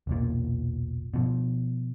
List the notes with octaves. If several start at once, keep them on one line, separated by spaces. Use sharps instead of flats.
E1 B1 A#2
B2 F3